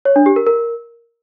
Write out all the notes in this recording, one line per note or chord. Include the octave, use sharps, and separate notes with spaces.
C#5
D4
G4
A#4
A#4